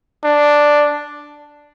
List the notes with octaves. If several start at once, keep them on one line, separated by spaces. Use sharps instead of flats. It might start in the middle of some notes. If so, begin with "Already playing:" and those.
D4